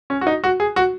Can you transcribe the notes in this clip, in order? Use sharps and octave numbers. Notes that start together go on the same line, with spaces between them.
C#4
F#4
D#4
F#4
G#4
F#4